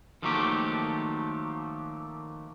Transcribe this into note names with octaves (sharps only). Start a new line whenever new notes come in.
D#3 F3 F#3 A3 A#3 G4